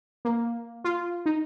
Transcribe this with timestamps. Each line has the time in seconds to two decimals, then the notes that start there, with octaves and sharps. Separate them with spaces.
0.25 A#3
0.84 F4
1.26 D#4